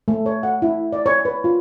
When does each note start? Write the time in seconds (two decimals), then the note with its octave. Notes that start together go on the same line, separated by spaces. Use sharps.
0.08 A3
0.26 C#5
0.43 F#5
0.62 E4
0.93 D5
1.06 C#5
1.25 B4
1.44 F4